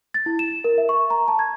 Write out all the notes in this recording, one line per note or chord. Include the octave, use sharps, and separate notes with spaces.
A6
E4
E7
A#4
E5
C#6
A#5
A5
G#6